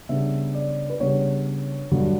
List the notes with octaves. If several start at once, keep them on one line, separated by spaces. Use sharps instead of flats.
C#3 G3 B3 D4 E5
D5
B4
C#3 G3 B3 D4 C#5
G2 D3 F#3